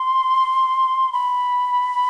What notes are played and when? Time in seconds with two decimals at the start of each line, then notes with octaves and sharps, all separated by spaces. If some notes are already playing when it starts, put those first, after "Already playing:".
Already playing: C6
1.13 B5